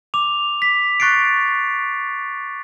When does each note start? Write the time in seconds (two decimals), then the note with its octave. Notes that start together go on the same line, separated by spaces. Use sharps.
0.14 D6 F7
0.62 B6
1.00 C#6 F#6 A6 C7 D7